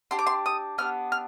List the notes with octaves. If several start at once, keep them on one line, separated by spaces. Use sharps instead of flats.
D4 G4 C6
D6
C6
D#6
B3 D4 G4 F6
F6